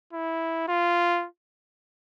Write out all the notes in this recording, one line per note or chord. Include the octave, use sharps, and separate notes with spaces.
E4
F4